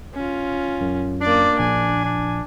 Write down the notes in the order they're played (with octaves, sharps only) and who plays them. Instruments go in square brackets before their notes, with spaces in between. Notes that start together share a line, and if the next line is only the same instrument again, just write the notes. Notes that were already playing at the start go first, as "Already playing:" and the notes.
[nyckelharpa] C#4 F4
[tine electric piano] F#2
[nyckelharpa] A#3 D5 [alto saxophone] D4
[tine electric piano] A#1 [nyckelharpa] G#5
[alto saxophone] D4